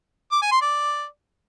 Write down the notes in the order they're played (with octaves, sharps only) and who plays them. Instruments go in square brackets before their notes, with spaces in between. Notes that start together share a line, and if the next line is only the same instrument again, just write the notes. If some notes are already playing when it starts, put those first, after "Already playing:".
[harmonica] D6
G#5
C6
D5